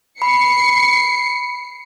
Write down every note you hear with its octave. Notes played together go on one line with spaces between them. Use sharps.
B5 C7 C#7